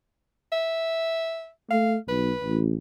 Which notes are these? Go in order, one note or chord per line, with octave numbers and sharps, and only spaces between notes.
E5
A3 F5
B1 B4
A1